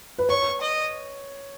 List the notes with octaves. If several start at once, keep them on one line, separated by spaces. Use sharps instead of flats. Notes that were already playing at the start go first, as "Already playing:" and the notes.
B4
C#5 C#6
D#5